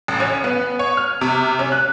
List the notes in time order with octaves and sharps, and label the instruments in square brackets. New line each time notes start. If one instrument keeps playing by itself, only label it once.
[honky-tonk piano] A1
C#4
B3
C#5
F6
C3
C#4
F#6